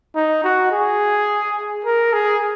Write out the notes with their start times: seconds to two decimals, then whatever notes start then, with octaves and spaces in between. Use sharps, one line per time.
0.15 D#4
0.44 F#4
0.72 G#4
1.85 A#4
2.13 G#4